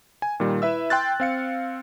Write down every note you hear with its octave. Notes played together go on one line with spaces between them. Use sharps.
G#5
A#2 D#3 G3
E4 B4 E5 E6
G5 C6 F#6 A6
C4 F5 C#7